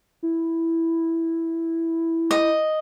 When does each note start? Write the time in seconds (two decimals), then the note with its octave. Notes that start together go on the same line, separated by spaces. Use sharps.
0.23 E4
2.31 D#5